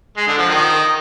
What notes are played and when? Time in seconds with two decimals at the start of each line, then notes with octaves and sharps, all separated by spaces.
0.17 G#3
0.28 D3
0.38 F3
0.49 D#3